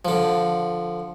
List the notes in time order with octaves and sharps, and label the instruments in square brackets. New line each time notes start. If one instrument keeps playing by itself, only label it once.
[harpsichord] D3 F3